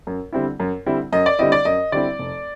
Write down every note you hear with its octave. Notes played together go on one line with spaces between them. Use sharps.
F#2
D3 G3 C4 E4
F#2
D3 G3 C4 E4
F#2 D#5
D5
D3 G3 C4 E4 D#5
D5
F#2 D#5
D3 G3 C4 E4 D5
F1